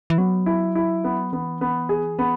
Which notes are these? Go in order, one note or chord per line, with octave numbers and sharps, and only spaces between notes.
E3
F#3 B3
E4
E4
B3
E3 B3
B3
G#4
B3